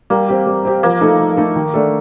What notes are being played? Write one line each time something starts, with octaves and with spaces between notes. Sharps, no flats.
G3 A#3
C4 G4
G3
C4 G4
F3 A#3
A3 D#4 A4
F3
A3 D#4 A4
D#3
A3 D4 A4